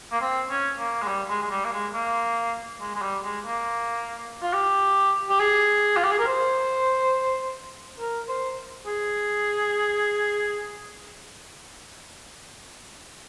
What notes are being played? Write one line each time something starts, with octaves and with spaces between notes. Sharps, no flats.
A#3
C4
C#4
A#3
G#3
G3
G#3
G#3
G3
A#3
G#3
A#3
G#3
G#3
G3
G#3
A#3
F4
G4
G4
G#4
F4
G4
G#4
A#4
C5
A#4
C5
G#4